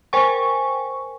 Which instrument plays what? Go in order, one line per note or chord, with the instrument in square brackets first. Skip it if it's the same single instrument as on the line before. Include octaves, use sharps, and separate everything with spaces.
[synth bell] A#4 C5 G5 G#5 C#6